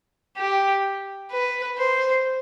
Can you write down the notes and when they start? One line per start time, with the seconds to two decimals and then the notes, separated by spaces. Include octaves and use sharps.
0.37 G4
1.31 B4
1.79 C5